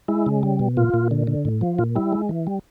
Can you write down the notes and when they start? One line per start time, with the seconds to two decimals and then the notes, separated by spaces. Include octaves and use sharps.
0.08 G#3 E4
0.26 C#3
0.43 G3
0.59 B2
0.77 A#2 F4
0.94 A#2
1.11 D3
1.27 D3
1.45 A2
1.61 F3
1.79 A#2 F4
1.95 G3 E4
2.12 G#3
2.29 E3
2.47 G3